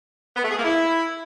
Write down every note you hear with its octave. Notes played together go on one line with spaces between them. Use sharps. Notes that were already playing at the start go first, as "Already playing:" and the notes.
B3
A3
G#4
A#3
E4